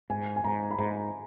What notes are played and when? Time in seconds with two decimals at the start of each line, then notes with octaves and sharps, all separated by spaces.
0.10 G#2 G#5
0.36 G#5
0.44 G#2 A#5
0.71 B5
0.79 G#2 A#5